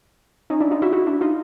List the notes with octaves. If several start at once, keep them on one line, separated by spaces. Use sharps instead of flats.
C#4 D#4
D4 E4
D#4 F4
E4 F#4
E4 F#4
D4 E4
D#4 F4